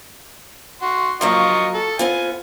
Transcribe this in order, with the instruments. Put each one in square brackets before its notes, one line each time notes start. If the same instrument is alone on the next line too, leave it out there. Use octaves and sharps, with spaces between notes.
[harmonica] F#4 C6
[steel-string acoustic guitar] F3 F#3 A#3 [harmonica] F4 D#5 C#6
[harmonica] A4
[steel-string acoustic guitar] B3 C4 F4 [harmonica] G#5